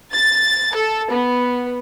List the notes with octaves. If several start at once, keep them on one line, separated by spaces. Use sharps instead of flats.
A6
A4
B3